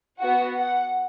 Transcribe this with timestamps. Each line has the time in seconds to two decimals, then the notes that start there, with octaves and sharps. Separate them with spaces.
0.19 B3 F#4 F#5
0.56 F#5